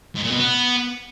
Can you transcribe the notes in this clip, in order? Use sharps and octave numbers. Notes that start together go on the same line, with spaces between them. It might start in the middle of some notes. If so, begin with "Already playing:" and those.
G#2
A#2
B2
B3